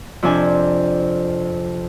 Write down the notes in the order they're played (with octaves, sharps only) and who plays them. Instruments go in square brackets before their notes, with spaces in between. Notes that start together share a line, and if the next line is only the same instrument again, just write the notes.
[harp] F2 C3 D4 G#5